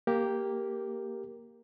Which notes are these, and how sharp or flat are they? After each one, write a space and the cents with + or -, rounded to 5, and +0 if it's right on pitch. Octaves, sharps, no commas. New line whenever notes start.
A#3 +0 G4 +0 A#4 +0